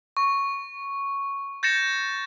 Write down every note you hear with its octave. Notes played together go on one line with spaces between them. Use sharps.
C#6
G6 A6 A#6 C#7 E7